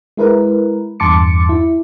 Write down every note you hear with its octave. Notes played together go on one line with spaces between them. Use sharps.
G#3 E4 A#4 B4
E2 G2 A5 C6 D6 C#7
E4